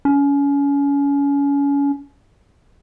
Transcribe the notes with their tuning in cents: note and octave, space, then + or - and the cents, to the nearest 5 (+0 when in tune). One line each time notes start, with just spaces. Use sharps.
C#4 +30